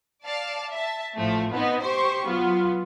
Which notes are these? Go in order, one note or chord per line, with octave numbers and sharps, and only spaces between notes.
D5 F5 A5
E5 A5
A1 A2 F3 A3
B3 C4 D#4 D#5
G4 C5 C6 C#6
F#3 B3 F4